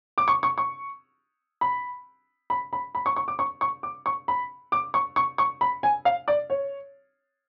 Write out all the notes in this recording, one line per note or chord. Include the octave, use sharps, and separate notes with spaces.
D6
C#6
C#6
C#6
B5
B5
B5
B5
C#6
C#6
D6
C#6
C#6
D6
C#6
B5
D6
C#6
C#6
C#6
B5
G#5
F5
D5
C#5